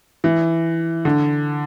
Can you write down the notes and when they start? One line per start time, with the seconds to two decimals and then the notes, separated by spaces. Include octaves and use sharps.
0.24 E3
1.05 D3